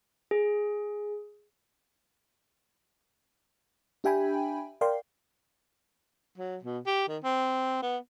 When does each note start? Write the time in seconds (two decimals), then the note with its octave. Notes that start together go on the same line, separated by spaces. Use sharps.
0.31 G#4
4.04 D4 G4 E5 G5 G#5 B5
4.81 A#4 D5 F5 G5 C6
6.38 F#3
6.63 B2
6.86 G4
7.08 D#3
7.23 C4
7.82 B3